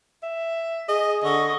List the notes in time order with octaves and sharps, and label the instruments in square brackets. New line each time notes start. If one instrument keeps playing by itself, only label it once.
[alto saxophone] E5
[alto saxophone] G#4 [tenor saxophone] D#5
[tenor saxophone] D3 [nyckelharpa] D#5 [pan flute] C#6